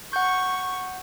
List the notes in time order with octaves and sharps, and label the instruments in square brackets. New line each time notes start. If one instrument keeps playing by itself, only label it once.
[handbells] F#5 G6 [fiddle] C#6